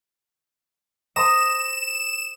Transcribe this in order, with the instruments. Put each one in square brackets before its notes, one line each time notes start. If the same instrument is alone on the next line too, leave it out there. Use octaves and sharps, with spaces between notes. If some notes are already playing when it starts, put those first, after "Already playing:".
[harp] C5 A#5 D#6 [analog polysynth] E7